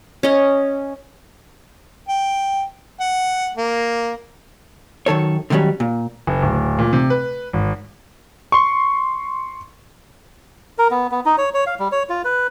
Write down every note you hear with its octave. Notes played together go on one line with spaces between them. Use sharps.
C#4 D#5
G5
F#5
A#3
F#2 D#3 A4 C#5
D3 D#3 F#3 G3 C#4
A#2
F#1
D1
A#2
C3
B4
G#1
C6 C#6
A#4
B3
B3
D#4
C#5
C#5
F5
G3
C#5
F4
B4